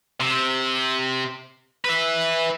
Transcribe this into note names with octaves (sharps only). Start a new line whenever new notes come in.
C3
B4 E5